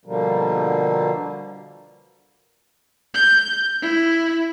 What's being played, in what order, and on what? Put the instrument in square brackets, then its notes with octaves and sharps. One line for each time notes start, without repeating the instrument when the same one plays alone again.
[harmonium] B2 D3 F3 G3 A#3
[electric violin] G6
E4